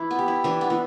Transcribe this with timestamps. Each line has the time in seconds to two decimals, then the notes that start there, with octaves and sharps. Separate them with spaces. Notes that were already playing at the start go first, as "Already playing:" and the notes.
Already playing: E3 E4
0.11 B3
0.19 G4
0.28 E4
0.44 E3 D4
0.61 B3
0.70 E3